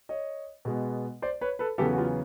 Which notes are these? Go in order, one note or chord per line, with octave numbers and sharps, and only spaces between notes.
C#5 D#5
B2 G#3 B3
C5 D5
B4 C#5
A4 B4
E2 C#3 F#3 B3 G4 A4
F#4
F4 G4